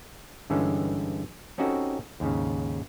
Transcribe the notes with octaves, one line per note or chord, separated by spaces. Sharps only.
G2 D3 E3 G#3 C#4
C4 C#4 D#4 F#4 G4 A4
D#2 G#2 C#3